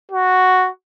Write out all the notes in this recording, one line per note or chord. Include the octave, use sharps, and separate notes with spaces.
F#4